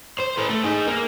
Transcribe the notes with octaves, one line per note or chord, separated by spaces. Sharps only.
C5
A4 B4
A3
D#4 G#4
A#3